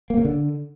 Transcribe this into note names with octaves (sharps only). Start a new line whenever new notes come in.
A#3
C#3
D3